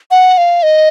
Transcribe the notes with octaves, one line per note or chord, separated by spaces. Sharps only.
F#5
F5
D#5